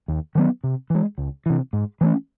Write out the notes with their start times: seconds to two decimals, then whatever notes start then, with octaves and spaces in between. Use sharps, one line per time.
0.08 D#2
0.35 D#3 F#3 B3
0.64 C3
0.90 E3 G#3
1.18 C#2
1.46 C3 E3
1.73 G#2
2.01 E3 A3 C#4